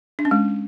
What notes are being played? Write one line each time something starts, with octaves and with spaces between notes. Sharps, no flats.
D4
C#4
G#3